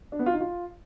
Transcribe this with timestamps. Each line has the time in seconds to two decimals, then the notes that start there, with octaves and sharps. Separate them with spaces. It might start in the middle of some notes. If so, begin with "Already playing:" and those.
0.12 D4
0.19 B3
0.26 F4
0.33 D#4
0.40 F4